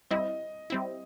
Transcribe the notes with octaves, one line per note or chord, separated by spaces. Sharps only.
G3 C4 E4 D#5
G3 C4 E4